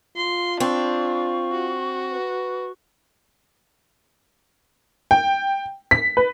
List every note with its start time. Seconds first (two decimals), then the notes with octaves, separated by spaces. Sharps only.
0.16 F4 C6
0.60 C4 D4 C#6
1.52 F#4
2.12 B4
5.11 G5
5.91 B6
6.17 B4